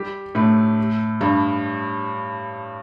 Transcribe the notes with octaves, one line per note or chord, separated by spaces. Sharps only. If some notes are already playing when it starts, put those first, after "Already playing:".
Already playing: G3 G4
A2 A3
G2 G3